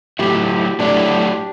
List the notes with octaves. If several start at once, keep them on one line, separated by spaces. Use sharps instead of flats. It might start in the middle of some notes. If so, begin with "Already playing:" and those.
A2 F#3 A3 E4 G4
G4
G4
A2 F#3 A3 D4 E4